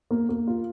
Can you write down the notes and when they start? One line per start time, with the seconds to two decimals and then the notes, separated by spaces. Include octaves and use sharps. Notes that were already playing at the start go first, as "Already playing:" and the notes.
0.11 A#3
0.29 A#3
0.47 F4